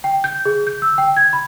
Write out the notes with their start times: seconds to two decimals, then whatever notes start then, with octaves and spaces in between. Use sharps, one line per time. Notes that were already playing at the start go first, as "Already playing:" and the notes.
0.04 G5
0.24 G6
0.45 G#4
0.67 G6
0.82 E6
0.98 G5
1.17 G#6
1.33 B5